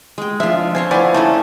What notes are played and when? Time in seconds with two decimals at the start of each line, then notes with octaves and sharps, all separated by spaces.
0.18 G#3 G5
0.40 F3 D4 F4 E5
0.75 C4 C5 C#5 G#5
0.91 F3 B3 E4 D5 G#5
1.14 A3 C4 C#4 D#4 E4 A4